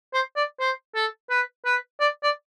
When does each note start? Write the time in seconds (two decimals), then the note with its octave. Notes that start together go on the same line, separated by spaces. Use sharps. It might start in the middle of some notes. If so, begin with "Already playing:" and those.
0.13 C5
0.36 D5
0.60 C5
0.95 A4
1.30 B4
1.65 B4
2.00 D5
2.23 D5